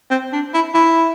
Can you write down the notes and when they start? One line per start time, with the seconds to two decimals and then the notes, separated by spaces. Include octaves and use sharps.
0.11 C4
0.33 D4
0.54 E4
0.74 E4